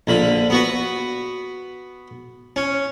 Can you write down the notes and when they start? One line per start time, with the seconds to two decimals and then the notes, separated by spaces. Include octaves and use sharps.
0.07 A#1 D3 B5
0.50 B3 F#4 B4
2.56 C#4